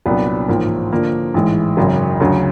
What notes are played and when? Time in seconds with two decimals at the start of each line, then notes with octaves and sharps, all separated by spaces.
0.06 C2 A#2 F#3 B3 D4
0.48 A1 G#2 F3 A#3
0.92 D3 F3 A#3 D4
1.34 A1 G#2 E3 G#3
1.77 G#1 F#2 C#3 F#3
2.20 D2 C#3 F#3